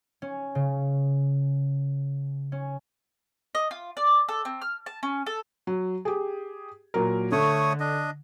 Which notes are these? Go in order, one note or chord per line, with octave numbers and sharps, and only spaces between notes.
C#4
C#3
C#4
D#5
F4
D5
A4
C4
F6
A5
C#4
A4
F#3
G4 G#4
A#2 F#3 A#4
D3 A3 C#5 D#6
D4 D#5